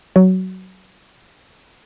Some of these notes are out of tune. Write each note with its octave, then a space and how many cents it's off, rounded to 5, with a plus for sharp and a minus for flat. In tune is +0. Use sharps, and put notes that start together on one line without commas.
F#3 +15